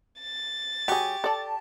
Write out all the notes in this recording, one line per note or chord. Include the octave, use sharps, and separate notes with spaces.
A6
F#3 G4 G#4 C#6
A4 D5 A5